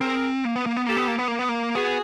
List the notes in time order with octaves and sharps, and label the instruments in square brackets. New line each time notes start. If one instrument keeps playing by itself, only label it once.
[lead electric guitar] C4 [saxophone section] G#4 A#4
[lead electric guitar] A#3
B3
A#3
B3
[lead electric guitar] A#3 [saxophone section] G4 A4
[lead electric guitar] B3
A#3
B3
A#3
B3
A#3
[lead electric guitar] B3 [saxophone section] F#4 G#4